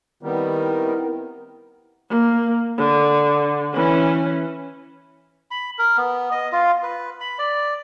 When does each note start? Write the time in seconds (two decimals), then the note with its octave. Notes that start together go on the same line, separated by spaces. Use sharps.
0.23 D#3 G3 B3 C4 E4 A#4
2.09 A#3
2.78 D3
3.74 E3 C#4
5.51 B5
5.79 A#4
5.97 B3
6.32 D#5
6.52 F4
6.83 B4
7.20 B5
7.39 D5